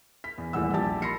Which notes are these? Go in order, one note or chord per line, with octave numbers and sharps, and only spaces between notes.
B6
E2
D#1 A1 E2 G3 F#5 E6
A#1 G4 A5 A6
B5 C6 A#6 C7 C#7